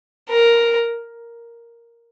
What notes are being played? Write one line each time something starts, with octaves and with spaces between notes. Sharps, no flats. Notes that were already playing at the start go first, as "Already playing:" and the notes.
A#4